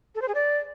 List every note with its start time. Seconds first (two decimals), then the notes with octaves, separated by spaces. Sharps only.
0.15 A4
0.22 C5
0.28 G#4
0.35 D5